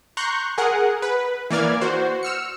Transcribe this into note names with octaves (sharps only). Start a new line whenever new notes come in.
A#5 C6 C#6 F#6 G6
G#4 A#4 F#5
B4
E3 A#3 D5 F6 G#6
F#4 C5
E6 F6 C#7